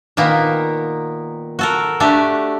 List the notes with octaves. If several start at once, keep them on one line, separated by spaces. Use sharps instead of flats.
A#2 D#3 A#3 B3
F#4 A4 A#4
A3 D4 F#4 G4